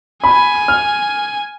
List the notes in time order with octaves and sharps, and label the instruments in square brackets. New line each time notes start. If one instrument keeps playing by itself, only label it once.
[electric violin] G#5 [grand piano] B5
[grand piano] F6